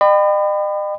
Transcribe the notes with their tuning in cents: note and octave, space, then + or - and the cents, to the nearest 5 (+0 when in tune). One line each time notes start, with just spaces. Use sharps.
D#5 -45 G5 +0 B5 +25